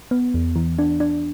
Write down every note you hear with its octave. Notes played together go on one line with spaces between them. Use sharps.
B3
E2
E3
D4
D4